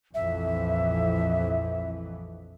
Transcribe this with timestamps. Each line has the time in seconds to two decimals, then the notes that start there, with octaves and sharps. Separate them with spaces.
0.14 A#1 F2 E3 E5